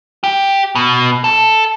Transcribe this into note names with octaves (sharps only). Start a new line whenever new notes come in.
G4
B2
A4